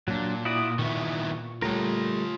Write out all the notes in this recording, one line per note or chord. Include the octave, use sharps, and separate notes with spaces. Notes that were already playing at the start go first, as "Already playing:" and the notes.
A#2 F#3 D4
E4 F#4 D5 D#6
A#2 D#3 B3 E4 C#6
G3 A3 F4 A#4 C#5